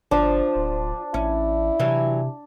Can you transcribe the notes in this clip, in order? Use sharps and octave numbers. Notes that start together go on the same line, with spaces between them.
G1 F3 D4
D1
A1 C#4 E4
C3 E3 F#3 G3